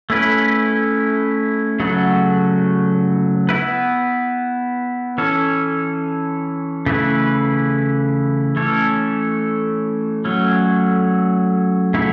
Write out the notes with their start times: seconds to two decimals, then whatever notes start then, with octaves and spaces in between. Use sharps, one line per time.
0.10 A3 C#4 E4 B4
1.80 C#3 F#3 A3 F#4
3.49 B3 E4 B4
5.18 E3 C#4 A4
6.86 C#3 E3 A3 E4 B4
8.56 E3 A3 C#4 A4 C#5
10.25 F#3 A3 C#4
11.94 C#3 F#3 A3 E4